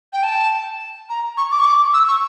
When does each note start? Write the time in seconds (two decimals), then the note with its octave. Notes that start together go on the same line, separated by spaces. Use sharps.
0.13 G5
0.23 A5
1.09 A#5
1.37 C#6
1.52 D6
1.59 C#6
1.66 D6
1.94 E6
2.08 C#6